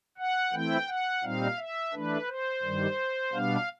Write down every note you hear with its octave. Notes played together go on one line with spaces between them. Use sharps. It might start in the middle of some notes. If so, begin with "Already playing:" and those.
F#5
E3 A3 C4 E4 G5
F#5
A#2 G3 C4 D#4 F5
E5
E3 A3 D4 B4
C5
G2 D#3 G3
B2 G3 B3 D4 F5